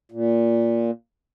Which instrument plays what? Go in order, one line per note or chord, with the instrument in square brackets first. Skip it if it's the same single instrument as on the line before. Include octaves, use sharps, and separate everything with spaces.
[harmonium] A#2